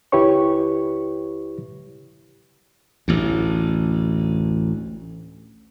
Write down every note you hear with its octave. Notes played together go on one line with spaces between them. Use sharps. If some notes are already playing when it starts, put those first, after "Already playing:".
C#2 E4 G4 B4 C#5 C#6
A1 D2